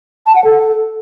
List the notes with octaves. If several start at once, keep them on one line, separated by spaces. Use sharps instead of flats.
A5
F#5
A4